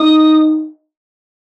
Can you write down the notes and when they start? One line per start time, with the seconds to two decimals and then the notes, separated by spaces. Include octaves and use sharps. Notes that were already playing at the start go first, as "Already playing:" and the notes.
Already playing: D#4 D#6